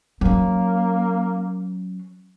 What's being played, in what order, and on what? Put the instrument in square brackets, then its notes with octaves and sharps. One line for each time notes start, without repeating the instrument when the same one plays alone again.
[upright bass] F#3 C#4 [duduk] A#3